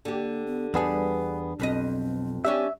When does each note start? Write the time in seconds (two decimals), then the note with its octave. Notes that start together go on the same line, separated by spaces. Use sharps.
0.05 D3 A#3 G4
0.47 B3
0.74 E2 G3 B3 D4 G#4 B4
1.60 B1 F2 C4 B4 D#5
2.45 C#4 D4 G4 E5